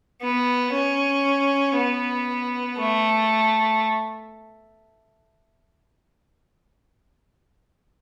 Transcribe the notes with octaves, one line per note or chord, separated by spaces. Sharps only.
B3
C#4
B3
A3